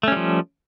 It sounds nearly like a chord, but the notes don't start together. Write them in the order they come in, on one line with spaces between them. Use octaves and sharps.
A3 C#4 G3 F3